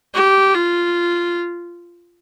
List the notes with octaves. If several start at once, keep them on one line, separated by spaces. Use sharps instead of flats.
G4
F4